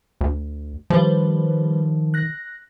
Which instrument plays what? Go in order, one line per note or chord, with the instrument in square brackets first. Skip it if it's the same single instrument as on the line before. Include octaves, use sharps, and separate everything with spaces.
[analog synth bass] D2
[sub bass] D#3 [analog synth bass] F3 [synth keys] G3 B4 C5
[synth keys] F#6 A#6